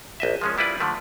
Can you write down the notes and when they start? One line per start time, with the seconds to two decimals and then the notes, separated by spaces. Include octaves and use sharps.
0.20 A#1 D#5 E5
0.41 F3 G#3 C#4
0.58 G3 E4 F4 B4 D5
0.80 D3 F3 A3